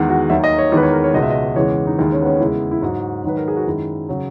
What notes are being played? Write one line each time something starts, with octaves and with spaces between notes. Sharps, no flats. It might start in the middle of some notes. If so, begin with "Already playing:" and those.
Already playing: E2 D#3 G#3
F#4
D#2 D#3 F#3 E5
D#5
C#5
E2 D#3 G#3 B4
C#5
A#4
C#5
C#2 B2 G#3 D#5
E5
D#5
E2 C#3 E3 G#3 C#5
D#4
D#2 D#3 G#3 E4
C#4
B3
C#4
E2 C#3 G#3 E4
E4
G#2 F#3 F#4
G#2 D#3 F#3 B4
A#4
G#4
F#4
F#2 D#3 G#3 E4
C#3 F#3